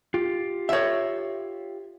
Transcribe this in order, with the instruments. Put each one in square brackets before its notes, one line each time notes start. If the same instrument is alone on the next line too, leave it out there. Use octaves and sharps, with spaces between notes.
[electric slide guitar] F4 G4
[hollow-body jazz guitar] C#5 E5